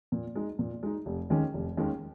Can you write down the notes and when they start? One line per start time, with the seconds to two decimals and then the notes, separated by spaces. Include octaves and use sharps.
0.12 A#2
0.35 G#3 D#4
0.59 A#2
0.83 G#3 D#4
1.06 F1
1.30 D#2 D#3 G#3 C#4
1.54 F1
1.77 D#2 D#3 G#3 C#4